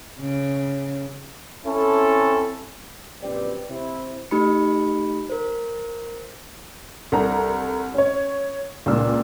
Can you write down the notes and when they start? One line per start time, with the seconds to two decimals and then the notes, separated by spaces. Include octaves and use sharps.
0.20 C#3
1.66 C4 C#4 E4 A4
3.21 A#1 F#2 C4 G4 B4 D5
3.70 C3 E4 C5
4.31 A3 D#4 G4 B5 C#7
5.29 A#4 C5
7.12 C2 C4 D4 A4 A#4 A#5
7.94 C#4 C#5
8.86 C#2 A#2 A#3 D4 E6